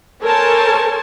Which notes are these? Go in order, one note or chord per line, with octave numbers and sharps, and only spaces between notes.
A4 A#4 C5 C#5 G#5 A5